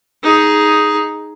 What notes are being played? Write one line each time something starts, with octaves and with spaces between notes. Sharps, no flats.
D#4 G#4